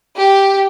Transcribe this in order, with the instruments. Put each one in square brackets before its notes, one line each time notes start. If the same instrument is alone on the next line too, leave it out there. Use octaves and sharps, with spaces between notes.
[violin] G4